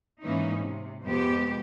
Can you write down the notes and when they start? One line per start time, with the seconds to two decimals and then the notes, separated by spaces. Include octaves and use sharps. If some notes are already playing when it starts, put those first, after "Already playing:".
0.22 G#2 E3 A#3 C#4 D#4
0.61 C3
1.04 F2 C3 G#3 B3 G4